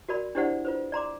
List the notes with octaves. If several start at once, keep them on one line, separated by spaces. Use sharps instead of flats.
F#4 A#4 D5 B5
D4 E4 G4 C5 D5 F#5
F4 B4 C5
D5 A#5 C6 D6